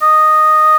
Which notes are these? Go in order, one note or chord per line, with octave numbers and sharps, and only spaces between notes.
D#5